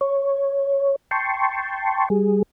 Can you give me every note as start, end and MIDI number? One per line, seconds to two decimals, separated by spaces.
0.01 0.96 73
1.11 2.09 79
1.11 2.09 81
1.11 2.09 84
1.11 2.09 85
2.10 2.42 55
2.10 2.42 68